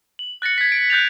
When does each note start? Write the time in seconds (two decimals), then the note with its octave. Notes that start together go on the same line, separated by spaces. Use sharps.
0.19 F#7
0.42 F#6 A6 A#6 C#7
0.58 G#6 B6
0.72 D7
0.90 F#6 G6 A6 F7